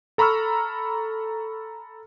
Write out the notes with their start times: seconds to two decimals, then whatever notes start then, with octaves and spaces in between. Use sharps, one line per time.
0.18 A4 A#5 B5 C#6 E6 F6